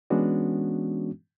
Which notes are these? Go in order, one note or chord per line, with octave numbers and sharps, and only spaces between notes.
E3 G#3 B3 C#4 D4 F#4